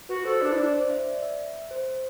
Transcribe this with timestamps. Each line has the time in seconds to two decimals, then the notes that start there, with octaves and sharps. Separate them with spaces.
0.09 F#4 B4
0.25 A4 C5
0.41 D4 D5
0.52 E4
0.57 D4 D5
0.74 C5
0.90 E5
1.06 D5
1.23 E5
1.71 C5